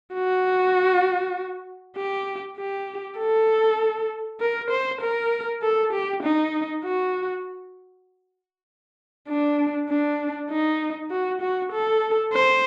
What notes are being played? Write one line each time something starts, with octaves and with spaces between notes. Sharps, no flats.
F#4
G4
G4
A4
A#4
C5
A#4
A4
G4
D#4
F#4
D4
D4
D#4
F#4
F#4
A4
C5